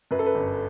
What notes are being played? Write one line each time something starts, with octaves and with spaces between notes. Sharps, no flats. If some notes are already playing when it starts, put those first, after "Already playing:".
F#2 B4
A4
B4
G1